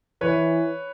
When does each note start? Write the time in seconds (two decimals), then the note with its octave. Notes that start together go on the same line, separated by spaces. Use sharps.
0.21 E3 B4 C#5